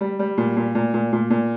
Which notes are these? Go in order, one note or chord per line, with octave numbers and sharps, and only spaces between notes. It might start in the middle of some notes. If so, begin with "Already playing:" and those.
G3
G3
A#2
A#2
A#2
A#2
A#2
A#2